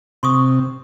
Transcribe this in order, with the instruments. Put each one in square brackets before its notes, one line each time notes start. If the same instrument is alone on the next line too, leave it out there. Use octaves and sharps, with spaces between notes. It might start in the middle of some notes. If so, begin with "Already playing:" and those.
[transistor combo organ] C3 [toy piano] C6 C#6 D#6